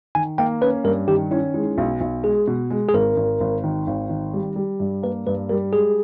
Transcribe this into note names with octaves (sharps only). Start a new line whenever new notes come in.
D#3 G#5
A#3 G5
C#4 B4
G2 A#4
D#3 G4
C#4 E4
G#3 E4
D#4
E4
B1
B1
G#3 G#4
B2
G#3
G#4
G#1 A#4
G#1
G#1
D#3
G#1
D#3
G3
G3
G2
A#3 B4
G2 B4
G3 A#4
G#3 G#4